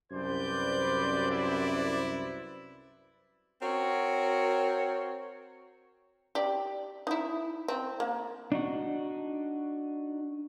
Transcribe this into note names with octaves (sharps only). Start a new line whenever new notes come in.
C2 F#2 B4 C5 D5 G6
E4
C4 F#4 A#4 C#5
G4 D5
D#4 E4
C4
A#3
D4 D#4 F#4